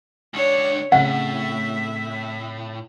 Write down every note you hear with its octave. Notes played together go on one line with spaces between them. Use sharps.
C#2 D4 C#5
A2 C#3 C4 E5 F#5